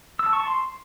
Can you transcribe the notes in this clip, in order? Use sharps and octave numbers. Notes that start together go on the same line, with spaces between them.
E6
A5
C#6
A5
C6